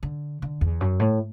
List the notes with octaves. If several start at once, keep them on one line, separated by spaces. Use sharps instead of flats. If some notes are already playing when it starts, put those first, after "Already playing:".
D3
D3
E2
F#2
A2